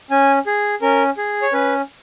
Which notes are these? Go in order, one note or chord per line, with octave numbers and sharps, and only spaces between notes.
C#4 G#5
G#4
C#4 A#4
G#4
C#5
C#4 B4